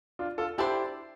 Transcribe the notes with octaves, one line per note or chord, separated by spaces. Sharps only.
D4 F4
F4 A4
D4 E4 G4 A4 C5